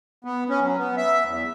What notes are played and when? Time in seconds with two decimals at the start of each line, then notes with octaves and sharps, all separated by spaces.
0.25 B3
0.49 C#4
0.62 F#3
0.78 B3
0.97 E5
1.25 E2